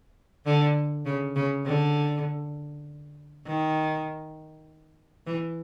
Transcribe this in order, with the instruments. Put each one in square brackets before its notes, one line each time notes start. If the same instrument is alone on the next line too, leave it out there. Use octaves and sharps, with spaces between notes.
[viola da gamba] D3
C#3
C#3
D3
D#3
E3